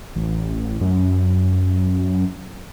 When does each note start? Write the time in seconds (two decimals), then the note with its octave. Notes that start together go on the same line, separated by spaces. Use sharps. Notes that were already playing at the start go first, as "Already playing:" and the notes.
0.16 A1
0.81 F#2